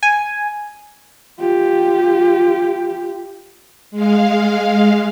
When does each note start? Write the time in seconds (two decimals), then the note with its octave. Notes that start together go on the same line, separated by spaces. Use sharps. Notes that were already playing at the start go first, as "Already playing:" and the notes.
0.03 G#5
1.39 F4 G4
3.91 G#3 F5